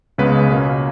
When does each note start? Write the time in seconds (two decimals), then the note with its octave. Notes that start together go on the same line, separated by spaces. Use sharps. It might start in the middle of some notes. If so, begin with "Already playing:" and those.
0.18 C#2 C#3 G#3 B3 B4
0.49 C#2 B2 A#3 C#4